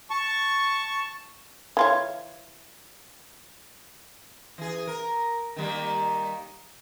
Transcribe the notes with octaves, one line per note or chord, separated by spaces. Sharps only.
A5 C#6
E3 F4 C#5
E3 G#4
A#4
D#3 G3 A#3